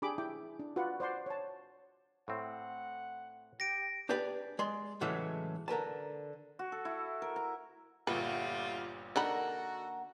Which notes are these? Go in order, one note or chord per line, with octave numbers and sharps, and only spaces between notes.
D4 G4 G#4 B5 D6
E4 G5 D6
D4
F4 F#4 B4 D5 F#5
C5 D5 F#5 C6
C#5 A5
A2 C4 F#5
G4 A#6 D7
D4 G4 G#4 B4 D5
G#3 D5 C6
A2 C#3 E3 F#3 G#3 A3
D3 A#4 B4 A5
F#4
A4
E4
A#4
A#5
G1 A#2 G3 A3 F4 F#4 B4
D3 A#3 D#4 F#4 A4 A#4 F#5 B5